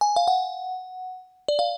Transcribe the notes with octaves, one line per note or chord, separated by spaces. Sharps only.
G#5
F5
F#5
D5
F5